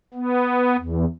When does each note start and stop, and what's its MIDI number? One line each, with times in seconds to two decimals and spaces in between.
0.14 0.77 59
0.77 1.05 40